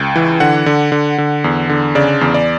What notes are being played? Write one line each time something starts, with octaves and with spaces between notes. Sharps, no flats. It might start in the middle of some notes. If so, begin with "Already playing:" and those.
Already playing: C#2 G5
E3
D3 F#5
D3
D3
D3
E2
D3
C#3 D5
E2
D5